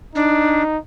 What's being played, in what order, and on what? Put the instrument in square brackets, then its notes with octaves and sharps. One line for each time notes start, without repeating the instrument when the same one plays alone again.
[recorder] D4 [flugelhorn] D#4